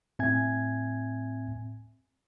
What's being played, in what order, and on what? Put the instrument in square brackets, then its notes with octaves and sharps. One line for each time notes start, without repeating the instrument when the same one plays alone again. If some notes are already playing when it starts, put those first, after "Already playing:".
[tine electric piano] A2 C4 E5 G#5 G#6